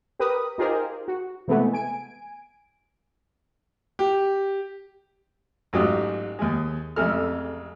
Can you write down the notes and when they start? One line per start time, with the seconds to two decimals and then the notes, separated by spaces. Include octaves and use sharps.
0.19 G4 A#4 B4 D#6
0.58 D#4 F4 G4 G#4 A#4 C5
1.08 F#4
1.48 C3 E3 G#3 A3 B3
1.73 G#5 D7
3.99 G4
5.73 A1 G#2 F#3 F4 G4 D#6
6.39 D#2 G#3
6.96 A1 F2 C3 G#3 A4 F6